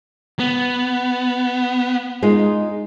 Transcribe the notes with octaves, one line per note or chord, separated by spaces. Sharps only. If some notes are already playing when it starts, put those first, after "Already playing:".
B3
G#3 D#4 F4